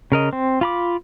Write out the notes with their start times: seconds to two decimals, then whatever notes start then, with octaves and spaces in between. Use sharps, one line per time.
0.12 C#3 A#4 D#5
0.33 C4
0.61 F4 B5 D6